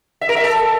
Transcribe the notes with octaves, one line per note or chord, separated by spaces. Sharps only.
E5
A#4
E5
A4